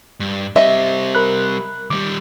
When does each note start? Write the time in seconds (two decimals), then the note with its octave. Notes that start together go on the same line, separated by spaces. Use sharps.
0.20 G2
0.56 G3 C4 D#5 E5
1.15 A#4 B5 F#6
1.90 D#2 G3 D6